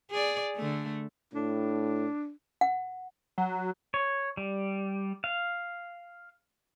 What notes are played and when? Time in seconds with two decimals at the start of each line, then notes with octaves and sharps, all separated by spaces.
0.10 G#4 D5
0.56 D3 A3
1.33 A2 D4
2.61 F#5
3.38 F#3
3.94 C#5
4.37 G3
5.24 F5